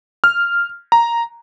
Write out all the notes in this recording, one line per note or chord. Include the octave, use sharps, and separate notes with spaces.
F6
A#5